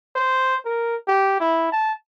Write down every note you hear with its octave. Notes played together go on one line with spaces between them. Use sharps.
C5
A#4
G4
E4
A5